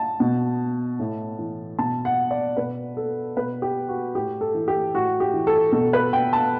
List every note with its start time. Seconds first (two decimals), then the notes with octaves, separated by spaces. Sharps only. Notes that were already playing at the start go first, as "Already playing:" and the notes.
Already playing: A5
0.20 B2
0.99 A2
1.39 E3
1.79 B2 A5
2.05 F#5
2.31 D5
2.57 B2 B4
2.97 A4
3.37 B2 B4
3.62 G4
3.89 F#4
4.15 A2 G4
4.41 A4
4.54 E3
4.68 G4
4.94 A2 F#4
5.20 G4
5.33 E3
5.47 A4
5.72 B2 A4
5.93 B4
6.13 G5
6.33 A5